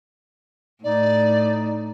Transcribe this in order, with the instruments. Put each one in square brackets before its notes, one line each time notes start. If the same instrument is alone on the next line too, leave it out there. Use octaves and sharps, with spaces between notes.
[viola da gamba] A2 [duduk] D#4 [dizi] D5